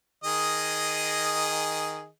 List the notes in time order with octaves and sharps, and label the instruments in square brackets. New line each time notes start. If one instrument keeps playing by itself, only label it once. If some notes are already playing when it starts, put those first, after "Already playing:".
[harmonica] D#3 G#4 D#5